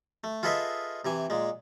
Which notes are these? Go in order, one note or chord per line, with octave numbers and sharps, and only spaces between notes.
A3
F4 G#4 A4 B4 D#5 E5
C3 E3 G#5
A#2 G#3